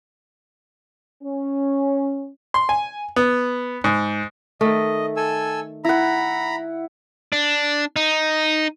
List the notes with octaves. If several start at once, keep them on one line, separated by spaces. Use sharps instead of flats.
C#4
C6
G#5
B3
G#2
D#3 A3 D#5
A4 G#5 E6
E4 F#5 A#5 B5
D4
D#4